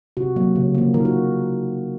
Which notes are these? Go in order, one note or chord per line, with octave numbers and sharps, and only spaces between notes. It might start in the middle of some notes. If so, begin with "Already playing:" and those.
C3 F#4
F#3 A#3
C#3
F3 A#3
D#3 A#4
F#4